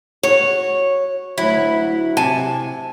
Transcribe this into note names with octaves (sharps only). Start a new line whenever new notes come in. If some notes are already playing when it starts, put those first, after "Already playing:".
F#4 C#5
D2 F#3 E4
C3 G#5 A5